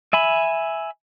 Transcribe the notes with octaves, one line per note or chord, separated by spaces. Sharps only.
E5 G#5 B5